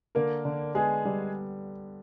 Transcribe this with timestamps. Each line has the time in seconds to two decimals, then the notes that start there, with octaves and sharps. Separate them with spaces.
0.15 D3 A#3 A#4
0.45 D3
0.75 G#3 B3 G#4
1.05 G3